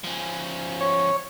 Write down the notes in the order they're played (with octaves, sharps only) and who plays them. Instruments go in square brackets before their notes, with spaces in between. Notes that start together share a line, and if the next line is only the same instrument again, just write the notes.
[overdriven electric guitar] F3 C#4
[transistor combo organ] C#5